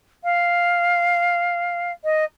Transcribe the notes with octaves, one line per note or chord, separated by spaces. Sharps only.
F5
D#5